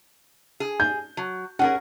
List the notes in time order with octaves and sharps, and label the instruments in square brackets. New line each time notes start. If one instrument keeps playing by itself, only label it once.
[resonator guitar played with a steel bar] G#4
[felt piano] G6
[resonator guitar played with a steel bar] F#3
[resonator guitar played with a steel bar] C#4 G#4 A#4 [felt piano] F#5